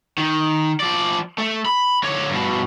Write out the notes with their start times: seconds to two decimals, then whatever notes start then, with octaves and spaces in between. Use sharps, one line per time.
0.18 D#3
0.80 F3 D5
1.38 A3 A4
1.65 B5
2.03 D3 C#5
2.30 G2 B2